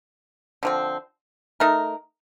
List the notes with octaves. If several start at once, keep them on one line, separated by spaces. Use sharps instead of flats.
D3 F3 C4
A3 D#4 A#4